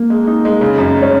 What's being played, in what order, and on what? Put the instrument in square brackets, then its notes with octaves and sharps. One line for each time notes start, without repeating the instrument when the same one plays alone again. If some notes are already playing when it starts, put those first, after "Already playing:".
Already playing: [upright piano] A#3
[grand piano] G#3
D#4
G#3
C#3
F#2
G#3
[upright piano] C#4